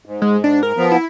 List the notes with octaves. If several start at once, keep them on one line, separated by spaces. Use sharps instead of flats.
G#2
G#3
D4
A#4
F3 B3
E4